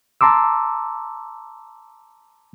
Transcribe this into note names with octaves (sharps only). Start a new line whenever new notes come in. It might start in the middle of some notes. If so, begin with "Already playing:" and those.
A5 A#5 C6 D6 E6